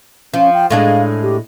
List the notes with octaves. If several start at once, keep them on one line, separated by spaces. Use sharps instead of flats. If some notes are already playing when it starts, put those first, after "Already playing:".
F3 C#4
G5
A2 G#3 D4 F5
G4